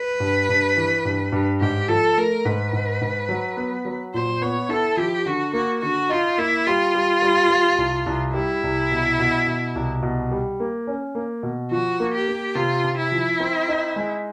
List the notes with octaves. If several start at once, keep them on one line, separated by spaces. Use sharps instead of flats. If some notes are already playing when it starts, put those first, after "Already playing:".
Already playing: B4
G2
G2
E3
G2
G2
G#2 G4
F3 A4
A3 A#4
G#2 B4
G#2
G#2
F#3
B3
F#3
A#2 C5
B3 C#5
E4 A4
F3 G4
D3 F#4
A#3 F#4
D3 F#4
D#4 F4
A#3 E4
G3 F4
G3
G3
G3
C2
C2
G3 E4
C2
B2
B2
B2
C2
B2
G3
A#3
C#4
A#3
B2
F3 F#4
A#3
G4
A#3
C3 F4
C3
E4
F3
C4
D#4
G#3